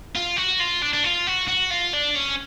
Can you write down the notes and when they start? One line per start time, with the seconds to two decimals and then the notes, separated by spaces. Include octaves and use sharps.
0.16 F4
0.37 F#4
0.60 F4
0.82 D4
0.94 D4
1.04 F4
1.27 F#4
1.48 F#4
1.71 F4
1.93 D4
2.15 C#4